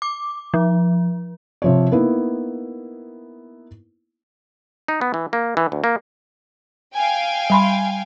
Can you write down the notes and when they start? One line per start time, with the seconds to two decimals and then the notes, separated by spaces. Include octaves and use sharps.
0.02 D6
0.54 F3
1.62 C3 F3 C#5
1.92 A#3 B3 D#4 E4
4.88 D#4
5.01 B3
5.14 E3
5.33 A#3
5.57 E3
5.72 D2
5.84 A#3
6.95 F5 G5 G#5
7.50 G3 B5 C6